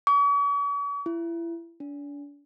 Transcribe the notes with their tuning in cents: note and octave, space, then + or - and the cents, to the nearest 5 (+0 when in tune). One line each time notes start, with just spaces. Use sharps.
C#6 +45
E4 +30
D4 -35